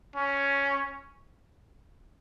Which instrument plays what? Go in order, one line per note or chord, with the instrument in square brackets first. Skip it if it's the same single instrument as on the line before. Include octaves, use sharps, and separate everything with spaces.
[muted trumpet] C#4